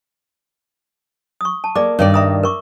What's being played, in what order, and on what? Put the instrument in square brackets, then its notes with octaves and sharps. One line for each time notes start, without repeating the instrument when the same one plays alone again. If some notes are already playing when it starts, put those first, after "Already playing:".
[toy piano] C#6 D#6
A5
[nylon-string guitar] A#3 [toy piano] G#4 D5 D6
[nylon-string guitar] G2 D#3 D5 [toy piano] C#5
[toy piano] E5 A#5 D#6
A#4 C#6 D6